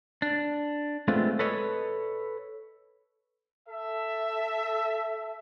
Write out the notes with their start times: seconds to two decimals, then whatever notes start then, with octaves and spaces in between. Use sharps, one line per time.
0.22 D4
1.08 G#3 A3 B3 C4 D4 F4
1.39 A4 B4 C#5 D#5
3.68 A4 E5